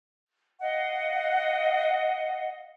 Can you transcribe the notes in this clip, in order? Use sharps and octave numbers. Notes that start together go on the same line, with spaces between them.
D#5 F5 F#5